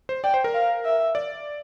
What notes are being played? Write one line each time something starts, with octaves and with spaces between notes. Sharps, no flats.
C5
D5 G5
C5
A#4
F5
E5
D5